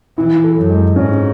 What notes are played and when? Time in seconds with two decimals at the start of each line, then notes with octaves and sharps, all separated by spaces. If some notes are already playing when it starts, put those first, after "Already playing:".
0.17 E3 E4
0.44 A4
0.57 F#2
0.70 G#3
0.96 G#2 C#4